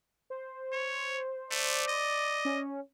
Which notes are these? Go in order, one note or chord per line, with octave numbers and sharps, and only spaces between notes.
C5
C#5
A3 D5
D#5
C#4